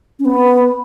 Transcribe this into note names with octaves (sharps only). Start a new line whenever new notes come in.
C#4
B3